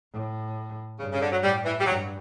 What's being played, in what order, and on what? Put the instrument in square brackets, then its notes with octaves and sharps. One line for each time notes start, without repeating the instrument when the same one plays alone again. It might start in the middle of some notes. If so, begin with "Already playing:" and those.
[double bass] A2
[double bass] G2 [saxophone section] C#3
[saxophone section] C#3
D3
F#3
[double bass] A2 [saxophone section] G3
[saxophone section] E3
G3
[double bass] G2 [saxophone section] F#3